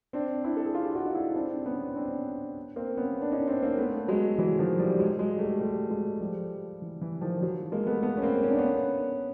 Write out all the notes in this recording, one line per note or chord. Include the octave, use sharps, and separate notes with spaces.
C4 D4
D4 E4
A4
G#4
F4 G4
E4 F#4
D#4
D4 E4
C4 D4
B3 C#4
C4 D4
A#3 C4
B3 C#4
D4
C#4 D#4
C4 D4
A#3 C4
A3 B3
F#3 G#3
E3 F#3
D#3 F3
F3 G3
G3
F#3 G#3
F#3 G#3
G3 A3
G3 A3
F#3 G#3
F3 G3
E3
E3
D#3 F3
E3 F#3
G#3 A#3
A3 B3
A3 B3
C#4
A#3 C4
C#4
D4
B3 C#4